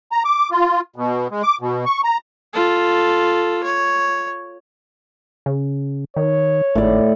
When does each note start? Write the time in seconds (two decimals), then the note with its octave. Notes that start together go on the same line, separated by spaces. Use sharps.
0.12 A#5
0.25 D6
0.51 F4
0.96 B2
1.31 G#3
1.43 D6
1.61 B2
1.86 C#6
2.04 A#5
2.53 F4 A4
3.63 C#5
5.46 C#3
6.16 D#3 C#5
6.75 G#1 A2 D5